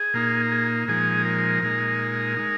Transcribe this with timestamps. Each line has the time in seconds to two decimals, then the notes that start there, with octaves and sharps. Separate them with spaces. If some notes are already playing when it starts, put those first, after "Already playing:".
Already playing: G#4
0.14 A#2 A#3 D#4
0.51 G#4
0.88 A#2 F3 G#3 D#4 G#4
1.25 A#4
1.63 A#2 G#3 D#4
2.37 G#3 D#4